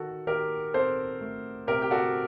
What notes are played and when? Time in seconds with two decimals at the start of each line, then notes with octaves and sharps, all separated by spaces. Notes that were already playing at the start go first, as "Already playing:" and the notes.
Already playing: D#3 F#4 A4
0.27 D#3 G4 A#4
0.74 C4 A4 C5
1.21 A3
1.67 C3 G4 A#4
1.82 G4
1.91 F#4 A4